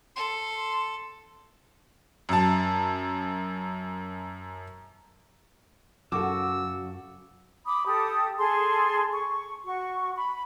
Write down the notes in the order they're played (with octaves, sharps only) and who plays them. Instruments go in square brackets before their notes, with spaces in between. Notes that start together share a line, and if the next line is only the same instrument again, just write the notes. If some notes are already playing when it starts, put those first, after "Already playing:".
[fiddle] A4 [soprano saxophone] C6
[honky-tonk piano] F#2 A5
[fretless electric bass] F#2 [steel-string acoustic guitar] C#3 F#4 [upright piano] A4 D6 [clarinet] E6
[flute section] B5 D6 D#6
G4 A4 D#6
G#4 A4 A5 C6
C#6
F#4 C#6
B5